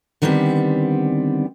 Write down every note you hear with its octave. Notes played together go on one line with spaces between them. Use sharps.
D3 D#3 G3 B3 C4 G4